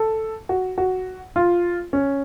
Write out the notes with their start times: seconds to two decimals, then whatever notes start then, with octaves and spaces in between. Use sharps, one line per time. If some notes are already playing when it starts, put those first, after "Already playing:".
Already playing: A4
0.49 F#4
0.78 F#4
1.36 F4
1.93 C#4